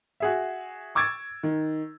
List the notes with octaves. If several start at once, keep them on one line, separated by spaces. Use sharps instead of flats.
F#4 G#4 E5
C#6 D6 E6 G#6 A6 D7
D#3